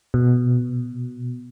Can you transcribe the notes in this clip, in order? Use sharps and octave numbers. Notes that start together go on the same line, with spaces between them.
B2